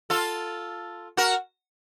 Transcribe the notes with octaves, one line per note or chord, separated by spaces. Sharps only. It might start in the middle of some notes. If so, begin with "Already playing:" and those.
F4 A4
F#4 A#4